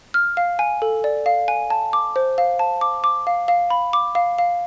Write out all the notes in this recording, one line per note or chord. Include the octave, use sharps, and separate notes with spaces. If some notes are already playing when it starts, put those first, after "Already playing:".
F6
F5
G#5
A4
D5
F5
G#5
A5
D6
C5
F5
A5
D6
D6
F5
F5
B5
D6
F5
F5